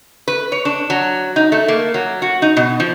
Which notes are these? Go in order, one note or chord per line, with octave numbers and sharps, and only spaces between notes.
B4
C#5
D4
F#3
D#4
A3
A#3
F#3
F#4
D#4
B2
F3